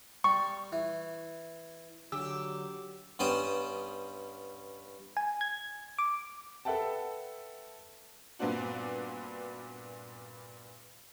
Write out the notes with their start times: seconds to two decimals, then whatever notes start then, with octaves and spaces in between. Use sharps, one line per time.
0.24 G3 C#6
0.72 E3
2.12 D3 F#3 G4 E6
3.19 G2 B3 C#4 C5 G5 D#6
5.17 G#5
5.41 G#6
5.99 D6
6.65 A4 B4 E5 F#5 G5 A5
8.39 G2 A#2 B3 C4 D4 F#4